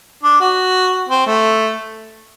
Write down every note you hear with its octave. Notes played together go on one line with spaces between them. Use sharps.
D4
F#4
C4
A3